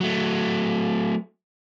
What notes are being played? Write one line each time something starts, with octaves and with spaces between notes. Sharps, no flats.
F#3 A3